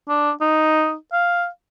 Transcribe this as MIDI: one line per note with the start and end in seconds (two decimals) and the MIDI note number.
0.09 0.31 62
0.41 0.95 63
1.13 1.48 77